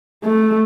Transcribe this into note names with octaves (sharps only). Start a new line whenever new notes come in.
A3